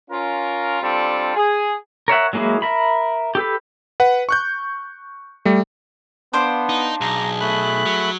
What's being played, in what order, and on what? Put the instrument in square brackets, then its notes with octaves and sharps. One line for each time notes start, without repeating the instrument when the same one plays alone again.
[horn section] C#4 F4 A#4
G3 C4 D4 F4 A4 D5
G#4
[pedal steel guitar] A#4 C#5 E5 F#5
F#3 G#3 A#3 E4 G#4
A#4 E5 B5
G4 A4 B4
[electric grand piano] B4 F#5
C#6 F#6 G6
G3 A3
[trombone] B3 [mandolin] D4 C5 F5
[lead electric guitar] D#4
[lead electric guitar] B1 [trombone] G#4 [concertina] A#5
[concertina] A3 B5 F#6
[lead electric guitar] F#3